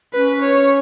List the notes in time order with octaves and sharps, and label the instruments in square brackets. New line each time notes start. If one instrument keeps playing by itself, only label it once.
[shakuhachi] C#4 [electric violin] B4
[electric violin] C#5